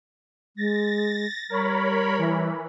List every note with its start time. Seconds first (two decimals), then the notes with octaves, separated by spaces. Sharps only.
0.57 G#3 A6 A#6
1.50 G3 A#4 C#5 B5
2.18 E3